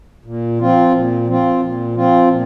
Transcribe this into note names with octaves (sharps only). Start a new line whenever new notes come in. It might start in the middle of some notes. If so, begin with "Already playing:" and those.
A#2
F3 C4 F4
A#2
F3 C4 F4
A#2
F3 C4 F4
A#2